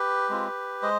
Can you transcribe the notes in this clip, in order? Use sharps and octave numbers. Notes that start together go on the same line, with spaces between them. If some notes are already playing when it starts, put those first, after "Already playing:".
Already playing: G4 B4
G#3 C4 F4
G#3 C5 D#5